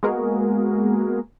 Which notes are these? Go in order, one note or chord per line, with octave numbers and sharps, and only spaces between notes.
G#3 A#3 B3 F#4 G#4 A#4